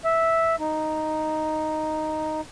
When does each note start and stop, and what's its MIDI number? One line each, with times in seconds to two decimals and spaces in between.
0.05 0.56 76
0.60 2.41 63